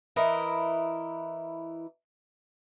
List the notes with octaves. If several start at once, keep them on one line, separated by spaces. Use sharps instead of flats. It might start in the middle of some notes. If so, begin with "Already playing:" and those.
E3 E4 A#4 D#5